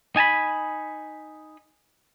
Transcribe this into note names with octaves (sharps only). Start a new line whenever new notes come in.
D#4 G#5 A5 B5